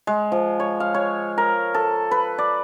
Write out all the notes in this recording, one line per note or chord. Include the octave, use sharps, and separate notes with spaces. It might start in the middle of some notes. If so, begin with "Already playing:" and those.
G#3
F3
C#5
F5
C#5
A#4
A4
B4
D5